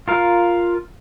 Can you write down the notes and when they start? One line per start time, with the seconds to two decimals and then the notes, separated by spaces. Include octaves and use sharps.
0.08 F4 A#4 F5